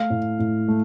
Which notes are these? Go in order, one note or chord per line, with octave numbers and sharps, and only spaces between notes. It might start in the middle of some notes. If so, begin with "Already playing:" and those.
Already playing: A3 F5
A2
A2
A3